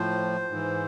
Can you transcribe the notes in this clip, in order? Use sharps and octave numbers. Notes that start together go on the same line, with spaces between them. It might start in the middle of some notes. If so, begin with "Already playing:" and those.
Already playing: A2 F3 C5
G#2 E3